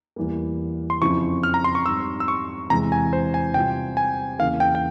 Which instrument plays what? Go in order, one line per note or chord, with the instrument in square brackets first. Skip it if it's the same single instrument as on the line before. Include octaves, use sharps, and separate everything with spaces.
[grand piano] E2 E3 G3 A#3
[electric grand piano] C6
[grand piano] F2 C#3 F3 C4 E4 [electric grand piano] C#6
[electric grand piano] F6
A#5
C6
C#6
[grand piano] G#2 G3 C4 [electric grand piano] E6
[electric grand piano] E6
C#6
[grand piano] E2 C3 E3 G#3 [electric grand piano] A#5
[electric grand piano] G#5
C5
G#5
[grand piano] C3 G3 C4 F4 [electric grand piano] G5
[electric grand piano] G#5
[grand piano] E2 C#3 E3 A#3 [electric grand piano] F5
[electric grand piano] G5
G5